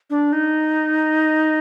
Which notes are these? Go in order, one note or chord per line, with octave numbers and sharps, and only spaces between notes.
D4
D#4